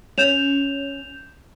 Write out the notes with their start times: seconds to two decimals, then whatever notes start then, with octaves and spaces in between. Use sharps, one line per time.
0.18 C#4 G6 E7 F7